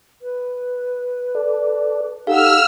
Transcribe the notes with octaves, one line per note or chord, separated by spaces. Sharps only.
B4
A4 D5
D#4 G4 A4 F5 F#5 E6 F6